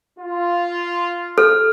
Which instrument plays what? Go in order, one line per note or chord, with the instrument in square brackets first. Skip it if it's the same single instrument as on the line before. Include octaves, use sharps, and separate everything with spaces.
[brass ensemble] F4
[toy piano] A4 [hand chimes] F6